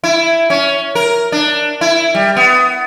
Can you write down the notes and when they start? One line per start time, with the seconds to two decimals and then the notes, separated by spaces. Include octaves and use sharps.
0.04 E4
0.50 C#4
0.95 A#4
1.32 D4
1.81 E4
2.15 G3
2.36 B3